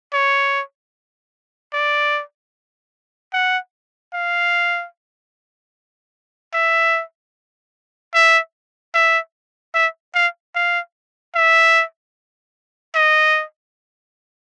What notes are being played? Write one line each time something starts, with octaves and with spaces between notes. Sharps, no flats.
C#5
D5
F#5
F5
E5
E5
E5
E5
F5
F5
E5
D#5